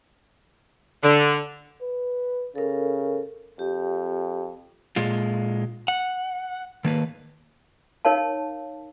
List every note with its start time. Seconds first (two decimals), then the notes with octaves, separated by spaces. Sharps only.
1.03 D3
1.81 B4
2.56 C#3 A4 A#4
3.59 F2 G4
4.96 A#2 G#3 F4
5.88 F#5
6.85 D#3 A#3 B4
8.05 D#4 A#4 C#5 F5 A5